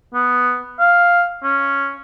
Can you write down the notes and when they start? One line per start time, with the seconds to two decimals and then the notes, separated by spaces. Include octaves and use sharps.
0.14 B3
0.80 F5
1.43 C#4